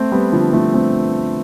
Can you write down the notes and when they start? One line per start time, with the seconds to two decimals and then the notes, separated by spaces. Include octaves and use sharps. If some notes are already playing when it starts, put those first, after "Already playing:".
Already playing: A3 C4
0.12 G3 B3
0.32 D3 F3
0.53 F3 A3
0.74 A3 C4